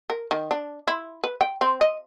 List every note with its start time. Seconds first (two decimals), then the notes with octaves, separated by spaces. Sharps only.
0.10 A#4
0.31 D#3
0.51 D4
0.88 E4
1.24 B4
1.41 G5
1.61 C4
1.81 D#5